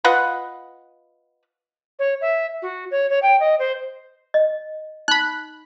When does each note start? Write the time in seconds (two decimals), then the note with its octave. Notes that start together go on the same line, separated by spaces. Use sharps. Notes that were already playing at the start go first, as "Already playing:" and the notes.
0.04 F4 B4 D#5 F#5
1.99 C#5
2.21 E5
2.62 F#4
2.91 C#5
3.10 C#5
3.22 G5
3.40 D#5
3.59 C5
4.34 D#5
5.08 D#4 B5 F#6